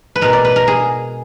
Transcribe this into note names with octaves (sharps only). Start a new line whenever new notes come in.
B4
B2 G#3 A#4
D5
B4
A#4
G#4